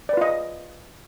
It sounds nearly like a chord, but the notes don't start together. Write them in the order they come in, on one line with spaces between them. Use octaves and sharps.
D5 B4 F4 D#5